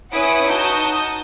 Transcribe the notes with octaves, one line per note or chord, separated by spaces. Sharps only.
C#4 E4 B4 F#5 D#6 D7
D#4 F#4 A5 D#6 G6